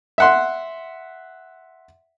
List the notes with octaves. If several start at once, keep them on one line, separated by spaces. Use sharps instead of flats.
E5 F#5 C6